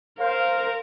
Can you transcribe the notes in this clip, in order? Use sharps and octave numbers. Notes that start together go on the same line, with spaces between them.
A#4 C5 F5